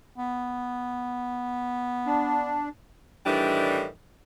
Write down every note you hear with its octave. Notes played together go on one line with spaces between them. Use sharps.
B3
D4
A2 D#3 E3 G3 D4